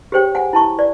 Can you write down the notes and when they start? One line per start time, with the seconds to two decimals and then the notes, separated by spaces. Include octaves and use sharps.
0.12 G4 G#4 C5 C#5 G5
0.35 F#5 G#5
0.53 E4 A5 C#6
0.79 D5